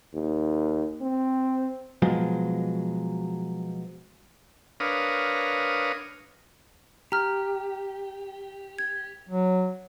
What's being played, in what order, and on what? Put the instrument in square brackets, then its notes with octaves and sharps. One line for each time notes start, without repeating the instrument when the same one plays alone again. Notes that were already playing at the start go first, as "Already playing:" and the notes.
[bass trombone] D#2
C4
[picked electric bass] B2 F3 F#3 G#3
[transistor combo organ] D4 A#4 B4 C#5 F5 D#6
[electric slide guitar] G4 [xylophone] A#5 F6
[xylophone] G#6
[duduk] F#3